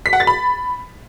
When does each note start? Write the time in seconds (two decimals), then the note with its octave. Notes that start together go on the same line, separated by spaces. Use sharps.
0.06 B6
0.13 F#5
0.20 A6
0.27 B5